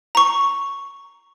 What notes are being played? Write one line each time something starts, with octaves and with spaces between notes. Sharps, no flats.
A#5 C#6